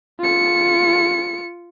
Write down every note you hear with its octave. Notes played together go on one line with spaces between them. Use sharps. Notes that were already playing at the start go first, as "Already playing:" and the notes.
F4 C#7